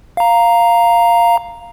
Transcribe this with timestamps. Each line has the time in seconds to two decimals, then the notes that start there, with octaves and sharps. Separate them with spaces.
0.17 F5 A#5